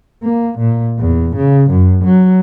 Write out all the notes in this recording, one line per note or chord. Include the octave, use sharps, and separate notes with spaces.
A#3
A#2
E2
C#3
F#2
F#3